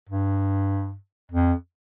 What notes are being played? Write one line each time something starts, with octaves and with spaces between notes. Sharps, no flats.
G2
F2